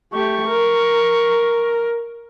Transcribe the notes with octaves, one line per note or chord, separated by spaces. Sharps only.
A3 G4 C#6
A#4